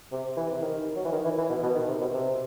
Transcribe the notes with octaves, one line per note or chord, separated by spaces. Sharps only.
C3
E3
C3
D#3
F#3
E3
D#3
E3
E3
B2
B2
D#3
C3
B2
C3